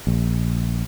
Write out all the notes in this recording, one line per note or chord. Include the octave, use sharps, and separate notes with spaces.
A#1